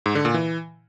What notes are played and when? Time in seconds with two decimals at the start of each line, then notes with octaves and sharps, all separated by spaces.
0.06 G#2
0.15 D3
0.25 A#2
0.34 E3